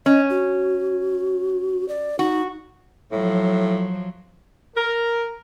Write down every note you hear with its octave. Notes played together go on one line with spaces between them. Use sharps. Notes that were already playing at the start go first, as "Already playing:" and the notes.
C#4 D#5
F#4
D5
D#4 F#4
A2 F3 F#3
A#4